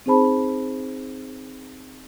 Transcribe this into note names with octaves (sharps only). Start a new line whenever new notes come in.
C4 D#4 G#4 C5 A5 B5